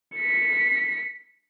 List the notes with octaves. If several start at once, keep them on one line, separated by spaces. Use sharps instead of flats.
B6 C#7